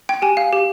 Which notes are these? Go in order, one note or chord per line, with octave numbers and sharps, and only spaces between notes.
G5
G4 G#5
F5
G4